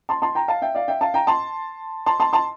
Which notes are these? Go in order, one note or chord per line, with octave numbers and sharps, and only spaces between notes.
A5 C6
A5 C6
G5 A#5
F5 A5
E5 G5
D5 F5
E5 G5
F5 A5
G5 A#5
A5 C6
A5 C6
A5 C6
A5 C6